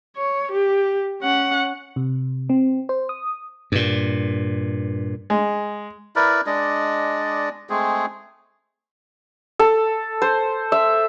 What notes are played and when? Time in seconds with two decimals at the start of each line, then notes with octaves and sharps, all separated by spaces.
0.17 C#5
0.52 G4
1.22 C#4 F#5
1.96 C3
2.49 C4
2.89 C5
3.09 D#6
3.72 G2 A#2
5.30 G#3
6.16 E4 A#4 B4 D5
6.46 G#3 D4 D5 D#5
7.70 G#3 A3 C4 G#4
9.59 A4
10.22 C5
10.72 E5